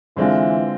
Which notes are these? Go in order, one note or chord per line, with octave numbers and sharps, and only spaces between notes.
D3 E3 G#3 C4 F4